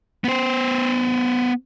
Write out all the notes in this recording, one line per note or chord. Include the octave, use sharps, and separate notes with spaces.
B3 C5